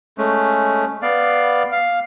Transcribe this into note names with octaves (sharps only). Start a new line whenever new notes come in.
G#3 A3 C#4
B3 D5 F5
F5